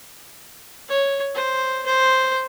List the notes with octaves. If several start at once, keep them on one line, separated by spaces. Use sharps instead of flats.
C#5
C5
C5